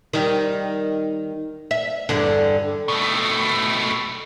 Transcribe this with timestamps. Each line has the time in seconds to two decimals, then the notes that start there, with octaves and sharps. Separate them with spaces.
0.13 D#3 G3
1.71 E5
2.09 E2 G2 D3
2.88 B2 A3